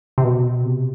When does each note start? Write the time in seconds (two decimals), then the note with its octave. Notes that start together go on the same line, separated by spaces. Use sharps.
0.18 C3
0.24 B2
0.65 C3